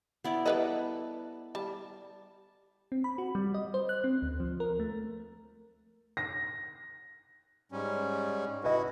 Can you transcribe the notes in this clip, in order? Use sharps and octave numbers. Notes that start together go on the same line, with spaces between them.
B3 E4 D5
G3 A4 B4 D#5 F#5 B5
G3 A5
C4
B5
F#4
G3
D#5
C5
F#6
C4
D2
F3
A#4
A3
A#6
G#2 G3 C#4
E4 F#4 B4 D#5